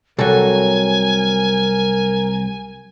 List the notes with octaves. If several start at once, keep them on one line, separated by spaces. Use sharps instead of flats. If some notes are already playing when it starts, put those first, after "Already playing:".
C2 F#3 A4 A#4 G#5